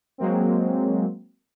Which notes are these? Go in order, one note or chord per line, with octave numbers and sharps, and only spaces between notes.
F#3 G#3 A#3 C4